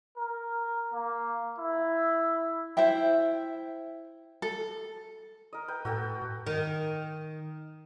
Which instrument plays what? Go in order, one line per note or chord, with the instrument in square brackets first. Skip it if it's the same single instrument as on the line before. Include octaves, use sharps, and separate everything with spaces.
[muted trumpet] A#4
A#3
E4
[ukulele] E4 C5 E5 G5
A4
[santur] A#4 D#5
B4 G5
[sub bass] A2 [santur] F#4 A4 G5
[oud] D#3